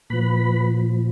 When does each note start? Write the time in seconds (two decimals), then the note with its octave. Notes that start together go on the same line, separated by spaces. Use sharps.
0.10 A#2 F3 B4 B5